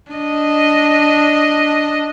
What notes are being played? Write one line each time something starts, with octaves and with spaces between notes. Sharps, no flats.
D4 D#5